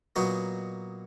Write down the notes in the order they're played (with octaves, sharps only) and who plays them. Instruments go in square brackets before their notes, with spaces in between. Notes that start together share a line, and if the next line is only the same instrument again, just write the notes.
[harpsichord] A#2 F#3 B3 D#4 F#4